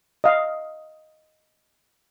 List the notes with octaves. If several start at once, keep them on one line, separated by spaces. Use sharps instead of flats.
D#5 F5